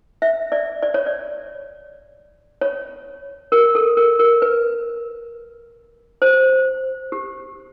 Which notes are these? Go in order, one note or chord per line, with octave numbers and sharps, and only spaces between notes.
E5
D5
D5
C#5
D5
C#5
A#4
A4
A#4
A#4
B4
C5
G4